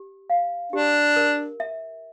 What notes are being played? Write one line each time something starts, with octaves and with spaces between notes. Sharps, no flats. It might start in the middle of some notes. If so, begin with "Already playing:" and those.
Already playing: G4
F5
D4 G4
A#4
E5